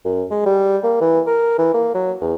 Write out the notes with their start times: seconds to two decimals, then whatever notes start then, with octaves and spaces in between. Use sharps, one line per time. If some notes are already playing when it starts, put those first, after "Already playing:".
0.05 F#2
0.31 G#3
0.46 G3
0.84 A#3
1.01 E3
1.27 A#4
1.58 E3
1.74 A#3
1.94 F#3
2.21 E2